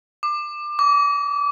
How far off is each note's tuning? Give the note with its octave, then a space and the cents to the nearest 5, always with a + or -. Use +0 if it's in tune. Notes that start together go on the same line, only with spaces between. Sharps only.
D6 +25
D6 -30